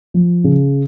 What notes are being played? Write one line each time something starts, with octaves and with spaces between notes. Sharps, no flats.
F3
C#3